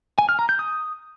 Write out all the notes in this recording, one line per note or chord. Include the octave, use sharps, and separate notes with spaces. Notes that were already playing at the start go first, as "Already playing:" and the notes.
G#5
F6
A#5
G6
D#6